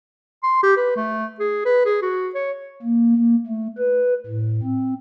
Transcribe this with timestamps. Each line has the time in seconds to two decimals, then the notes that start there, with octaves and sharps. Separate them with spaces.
0.43 C6
0.63 G4
0.77 B4
0.96 A3
1.40 G#4
1.65 B4
1.85 G#4
2.02 F#4
2.35 C#5
2.82 A#3
3.16 A#3
3.47 A3
3.78 B4
4.26 A2
4.63 C4